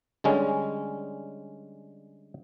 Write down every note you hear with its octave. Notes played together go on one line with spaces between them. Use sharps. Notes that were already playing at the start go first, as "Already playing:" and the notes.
D3 G3 G#3 C#4